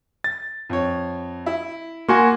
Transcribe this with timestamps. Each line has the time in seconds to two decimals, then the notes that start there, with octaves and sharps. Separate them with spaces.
0.24 A6
0.70 F2 C#5
1.46 E4
2.09 A#3 F#4 G#5 C6